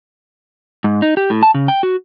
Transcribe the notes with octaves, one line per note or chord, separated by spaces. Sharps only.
G#2
D#4
G4
A2
A5
C#3
G5
F#4